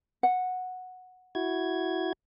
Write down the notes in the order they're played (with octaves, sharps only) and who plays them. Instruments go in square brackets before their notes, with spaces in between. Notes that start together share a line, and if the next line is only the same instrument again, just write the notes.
[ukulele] F#5
[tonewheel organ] E4 F#4 G#6